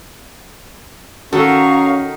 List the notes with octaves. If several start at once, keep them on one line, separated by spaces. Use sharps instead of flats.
D#3 C#4 F#4 A4 F5 A#5 C#6